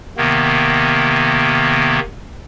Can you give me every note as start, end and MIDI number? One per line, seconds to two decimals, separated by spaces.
0.17 1.99 48
0.17 1.99 51
0.17 1.99 58
0.17 1.99 59